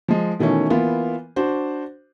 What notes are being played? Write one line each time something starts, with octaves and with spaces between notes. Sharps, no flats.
F3 G#3
B2 D#3 E3 A3 C#4
E3 A#3 B3 F4
D4 F#4 C5